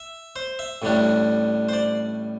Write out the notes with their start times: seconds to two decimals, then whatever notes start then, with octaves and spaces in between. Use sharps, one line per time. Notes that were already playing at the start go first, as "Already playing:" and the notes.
Already playing: E5
0.36 C5
0.59 E5
0.82 A1 A2 G3 D4
1.69 C5
1.73 D5